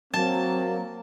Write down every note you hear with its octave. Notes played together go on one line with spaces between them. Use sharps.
F#3 A#3 C4 A5